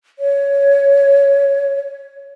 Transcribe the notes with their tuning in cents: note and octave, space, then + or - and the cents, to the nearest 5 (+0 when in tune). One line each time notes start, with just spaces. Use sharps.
C#5 +10